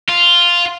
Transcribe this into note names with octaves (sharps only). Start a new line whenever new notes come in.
F4